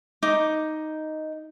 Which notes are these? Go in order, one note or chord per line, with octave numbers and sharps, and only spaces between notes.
D#4 D6